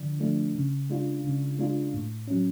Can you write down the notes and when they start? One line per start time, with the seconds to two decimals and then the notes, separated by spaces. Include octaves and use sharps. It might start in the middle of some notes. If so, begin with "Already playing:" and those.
Already playing: D3 F3 D4
0.20 F3 A3 D4
0.55 C#3
0.90 G#3 D4 F4
1.24 C#3
1.59 G#3 D4 F4
1.94 A2
2.27 F#3 C#4